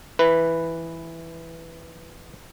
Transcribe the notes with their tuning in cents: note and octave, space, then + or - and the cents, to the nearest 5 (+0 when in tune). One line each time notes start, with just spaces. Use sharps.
E3 +0 B4 +0